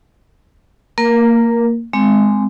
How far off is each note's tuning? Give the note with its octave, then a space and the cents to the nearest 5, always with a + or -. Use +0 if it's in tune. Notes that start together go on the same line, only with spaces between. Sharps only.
A#3 -15 A#4 +15
G#3 +0 C4 -20